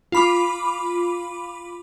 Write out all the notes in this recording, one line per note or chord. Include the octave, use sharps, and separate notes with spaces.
F4 B5 D6